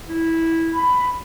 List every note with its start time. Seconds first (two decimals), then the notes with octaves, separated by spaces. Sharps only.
0.09 E4
0.73 B5